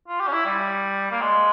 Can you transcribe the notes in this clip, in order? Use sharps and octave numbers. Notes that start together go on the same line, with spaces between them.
F4
G4
C#4
E4
G3
A#3
G#3